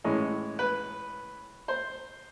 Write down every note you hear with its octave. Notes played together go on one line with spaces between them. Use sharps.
A2 E3 G#3 C#4
B4
C5